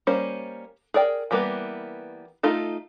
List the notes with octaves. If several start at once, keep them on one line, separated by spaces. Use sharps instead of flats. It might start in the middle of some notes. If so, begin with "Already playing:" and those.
G3 A#3 C#4 C5
G#4 A#4 D5 G5
E3 G3 A#3 B3 B4
A3 D#4 F4 A4